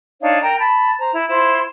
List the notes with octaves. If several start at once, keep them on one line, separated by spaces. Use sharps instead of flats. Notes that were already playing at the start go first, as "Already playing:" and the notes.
D4 D#4 C#5 F5
A#4 G5 A#5
A5 B5
C5 A#5
E4
E4 F4 C5